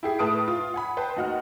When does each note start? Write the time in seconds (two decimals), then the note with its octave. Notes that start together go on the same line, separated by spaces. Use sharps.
0.03 E4 G4 G#4
0.19 A2 B4 A5 D#6 F6 D7
0.48 F4
0.74 F#5 G#5 B5
0.97 B4 C5 G5 A5
1.16 D#2 D#4 F#4 F#5 F6